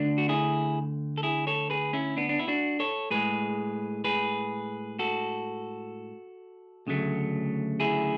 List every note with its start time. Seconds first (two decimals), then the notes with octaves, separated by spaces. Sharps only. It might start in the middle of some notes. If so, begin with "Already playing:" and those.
Already playing: D2 D3 A3 D4
0.18 F#4
0.29 E4 G#4
1.18 A4
1.23 E4 G#4
1.47 A4 C#5
1.70 G#4 B4
1.93 C#4 E4
2.17 B3 D4
2.29 D4
2.39 E4
2.48 D4 F#4
2.80 A4 C#5
3.10 A2 G#3 G#4 B4
4.04 G#4 B4
4.99 F#4 A4
6.87 D2 C#3 F#3 A3
7.80 E4 G#4